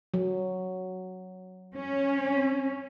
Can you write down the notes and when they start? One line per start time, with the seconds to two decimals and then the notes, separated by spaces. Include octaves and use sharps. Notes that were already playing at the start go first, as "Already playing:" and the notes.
0.14 F#3
1.75 C#4